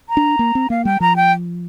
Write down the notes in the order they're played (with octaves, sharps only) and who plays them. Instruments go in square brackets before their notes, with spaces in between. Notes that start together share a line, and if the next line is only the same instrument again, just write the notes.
[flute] A#5
[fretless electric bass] D4
A#3
C4
[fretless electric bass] A#3 [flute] F5
[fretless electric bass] G3 [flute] G5
[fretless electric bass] F3 [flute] A#5
[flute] G5